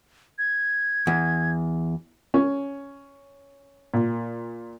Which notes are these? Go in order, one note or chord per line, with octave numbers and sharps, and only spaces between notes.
G#6
E2
C#4
A#2